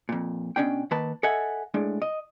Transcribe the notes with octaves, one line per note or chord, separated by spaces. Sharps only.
F2 A#2
B2 A3 C#4 D4 G5
D#3 A#3 B4 A5
A4 D#5 E5 F#5 G#5
A2 G#3 D4
D#5